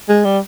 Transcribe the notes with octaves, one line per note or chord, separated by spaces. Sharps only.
G#3
G3